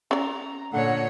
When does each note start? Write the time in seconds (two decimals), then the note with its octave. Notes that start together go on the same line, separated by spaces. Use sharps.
0.11 C#4 D5 A#5
0.73 A#2 D3 C#5 F#5